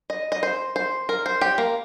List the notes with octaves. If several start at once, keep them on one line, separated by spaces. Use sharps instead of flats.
D#5
D#5
C5
C5
A#4
C5
G4
A#3